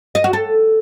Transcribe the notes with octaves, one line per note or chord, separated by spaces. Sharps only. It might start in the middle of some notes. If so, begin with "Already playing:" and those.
D#5
F#4
A4